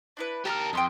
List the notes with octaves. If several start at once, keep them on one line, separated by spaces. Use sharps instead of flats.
D4 E4 B4
G4 A#4 A5 A#5 F6
F2 G5 C6 D#6